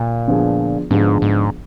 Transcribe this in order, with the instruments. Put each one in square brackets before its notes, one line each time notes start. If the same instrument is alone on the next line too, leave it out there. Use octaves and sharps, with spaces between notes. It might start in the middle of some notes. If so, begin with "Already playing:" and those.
Already playing: [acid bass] A#2
[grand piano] D3 F3 B3 D4 G#4
[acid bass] G#2 [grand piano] D3 F3 B3 D4 G#4
[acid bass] G#2